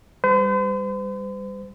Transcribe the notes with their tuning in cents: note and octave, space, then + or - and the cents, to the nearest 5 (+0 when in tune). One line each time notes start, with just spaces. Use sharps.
G3 +20 C5 -45